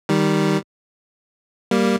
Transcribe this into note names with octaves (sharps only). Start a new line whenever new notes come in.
D#3 G3
G3 A#3